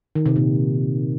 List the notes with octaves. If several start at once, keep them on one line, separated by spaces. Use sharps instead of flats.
D#3
C3
A#2